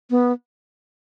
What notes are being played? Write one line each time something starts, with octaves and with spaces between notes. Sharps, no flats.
B3